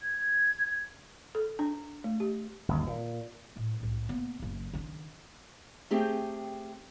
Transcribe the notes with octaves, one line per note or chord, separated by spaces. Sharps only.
G#6
A4
D4
A3
G4
G1 D#2
A#2
A2 G#3
C2 A2
A#3 B3
F#1 C#3
D#3 D4
A3 C4 G4 G#4 G5